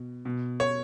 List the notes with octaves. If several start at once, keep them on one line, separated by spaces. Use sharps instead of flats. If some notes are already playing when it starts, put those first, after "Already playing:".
Already playing: B2
B2
C#5